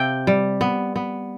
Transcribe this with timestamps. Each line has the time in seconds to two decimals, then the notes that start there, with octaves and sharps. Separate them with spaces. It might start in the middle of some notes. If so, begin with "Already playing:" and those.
Already playing: C3 F5 G5
0.27 G3
0.61 B3
0.96 B3